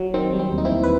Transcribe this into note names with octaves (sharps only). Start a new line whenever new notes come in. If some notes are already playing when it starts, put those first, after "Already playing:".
Already playing: F#3
D#3 C4
G3
C4
D#2
D#4
C4 E4
D#2
B4